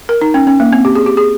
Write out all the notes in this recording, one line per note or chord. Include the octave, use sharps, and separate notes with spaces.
A#4
D#4
C#4
C#4
A#3
C4
G4
G#4
G4
G#4